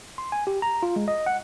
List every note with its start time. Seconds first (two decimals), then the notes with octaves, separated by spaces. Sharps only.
0.18 C6
0.32 G#5
0.47 G4
0.62 A#5
0.83 F4
0.96 G#3
1.08 D#5
1.26 F#5